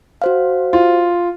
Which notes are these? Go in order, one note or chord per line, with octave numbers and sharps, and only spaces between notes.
F#4 C5 F5
F4